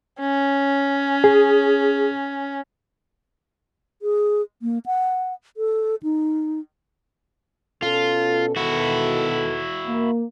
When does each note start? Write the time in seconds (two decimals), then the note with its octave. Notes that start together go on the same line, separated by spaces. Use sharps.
0.20 C#4
1.24 G#4
4.02 G#4
4.62 A#3
4.86 F#5
5.57 A4
6.03 D#4
7.82 B2 C#4 F4 A4
8.56 B2 D#3 E4 F#4 A4
9.87 A#3